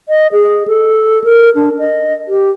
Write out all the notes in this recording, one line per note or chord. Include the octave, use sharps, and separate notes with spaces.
D#5
G#4
A4
A#4
D4
D#5
G4